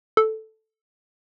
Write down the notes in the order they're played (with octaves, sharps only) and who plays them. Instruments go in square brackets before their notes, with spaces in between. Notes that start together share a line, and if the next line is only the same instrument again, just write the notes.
[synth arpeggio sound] A4